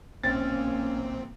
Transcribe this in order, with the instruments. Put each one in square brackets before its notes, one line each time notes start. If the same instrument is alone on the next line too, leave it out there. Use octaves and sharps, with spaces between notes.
[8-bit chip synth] A#1 C4 [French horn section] A#3 [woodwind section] C#4 [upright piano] A6